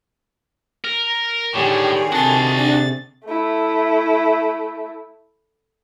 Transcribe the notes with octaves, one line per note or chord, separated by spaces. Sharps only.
A#4
A2 D3 D#3 G4 G#4 C#5 D5
C3 F#4 A5 C6 A6
D4
A3 E4